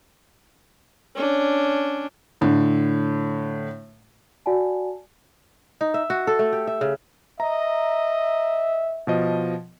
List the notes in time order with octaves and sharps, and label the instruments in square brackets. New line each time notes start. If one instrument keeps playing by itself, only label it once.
[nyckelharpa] C#4 D4
[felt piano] A2 D3
[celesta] F#4 D5 F#5 G#5 A5
[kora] D#4
E5
F#4
A4
A3
G4
E5
C#3
[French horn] D#5 [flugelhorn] E5 [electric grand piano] A#5
[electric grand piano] B2 F3 D#5